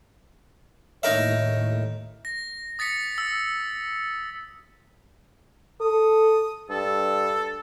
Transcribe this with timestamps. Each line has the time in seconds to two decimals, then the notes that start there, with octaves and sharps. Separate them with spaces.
1.03 D#2 A2 D#4 A#4 C#5 E5
2.25 A#6
2.79 D#6 A6 B6 C#7
3.18 E6
5.81 A4 D#6
6.70 G2 A4